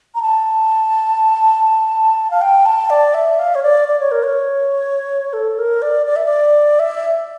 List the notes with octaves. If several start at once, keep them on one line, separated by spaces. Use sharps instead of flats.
A#5
A5
F5
G5
A5
D5
E5
F5
C#5
D5
D5
C#5
A#4
C#5
A4
A#4
D5
D5
E5
D5
E5